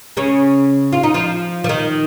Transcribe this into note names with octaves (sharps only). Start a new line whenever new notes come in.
C#3 C#4
F4
D#4
F3 F4
F3
D#3